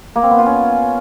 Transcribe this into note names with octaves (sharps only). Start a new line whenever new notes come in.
A#3
C4
B3
F4
C#4